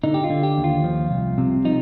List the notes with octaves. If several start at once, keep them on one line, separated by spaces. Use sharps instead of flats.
D3 D#4
G4
F4
D3
G4
D#2
F4
F3
C2
C3
F3 D#4